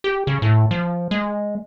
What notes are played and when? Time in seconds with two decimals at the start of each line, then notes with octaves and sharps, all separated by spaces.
0.04 G4
0.27 C#3
0.42 A2
0.71 F3
1.11 G#3